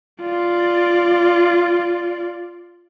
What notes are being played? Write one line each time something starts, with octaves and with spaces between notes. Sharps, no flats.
F4 D5